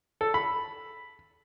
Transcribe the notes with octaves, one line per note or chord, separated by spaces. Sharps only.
A4
B5